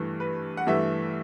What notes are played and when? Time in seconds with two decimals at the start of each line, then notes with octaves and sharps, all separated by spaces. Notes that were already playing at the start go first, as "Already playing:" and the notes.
Already playing: G2 E3 A3
0.20 B4
0.57 F#5
0.67 G2 E3 A3 E5